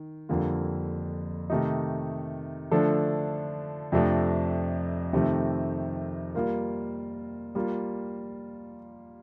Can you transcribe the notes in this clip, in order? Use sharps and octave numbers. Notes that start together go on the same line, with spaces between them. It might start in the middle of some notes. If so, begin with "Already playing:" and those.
Already playing: D#3
F2 D3 G3 A#3 F4
C3 D#3 A3 D#4
D3 F3 A3 D4 A4
F2 C3 F3 A3 D4
F2 C3 D#3 A3 C4
G3 A#3 F4 A#4
G3 A#3 F4